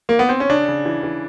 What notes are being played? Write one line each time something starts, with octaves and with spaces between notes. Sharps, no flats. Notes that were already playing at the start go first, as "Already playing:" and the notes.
A#3
B3
C4
C#4
C#3 D4
C#3
E3
E3